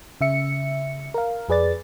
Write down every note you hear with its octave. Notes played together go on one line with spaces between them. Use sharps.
C#3 E5 C#7
A#4 F5
F2 G#4 B4 D5 A6